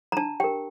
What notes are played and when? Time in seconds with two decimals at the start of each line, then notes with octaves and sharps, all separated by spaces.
0.12 A#5
0.17 D4 A5
0.40 G4 A#4 G5